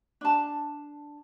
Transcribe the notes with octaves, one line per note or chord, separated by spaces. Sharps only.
D4 A5